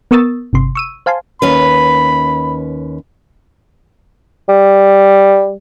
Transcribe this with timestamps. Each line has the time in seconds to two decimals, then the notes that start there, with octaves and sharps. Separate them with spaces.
0.11 B3 A#4 C#6 D#6 E6 A6
0.53 G1 C3 C6
0.75 C#6 E6 D#7
1.06 C5 F5 G#5 A5 C6
1.42 D#2 C#4 B4 B5
4.48 G3